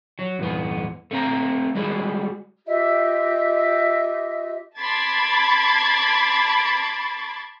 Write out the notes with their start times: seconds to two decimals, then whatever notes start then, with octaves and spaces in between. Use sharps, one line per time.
0.19 F#3
0.39 E2 G2 B3
1.11 A3 C4 A#5
1.75 G3 G#3 F#4 G#4
2.67 F4 G4 D#5 E5
4.79 A5 B5 C6 D6 G#6 A6